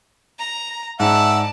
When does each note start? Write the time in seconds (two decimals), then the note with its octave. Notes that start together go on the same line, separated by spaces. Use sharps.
0.39 A#5
1.00 G#2 D5 E5 F#5 A5